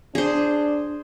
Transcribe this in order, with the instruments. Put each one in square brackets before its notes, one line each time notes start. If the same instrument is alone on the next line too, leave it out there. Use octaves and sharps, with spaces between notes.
[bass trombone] D4 [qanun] G#4 C5